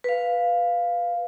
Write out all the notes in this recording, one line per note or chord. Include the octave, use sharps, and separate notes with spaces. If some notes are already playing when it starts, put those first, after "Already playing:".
B4 F5